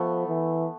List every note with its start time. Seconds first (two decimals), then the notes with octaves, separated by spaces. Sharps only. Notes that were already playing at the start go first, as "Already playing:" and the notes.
Already playing: F3 A3 B3
0.28 E3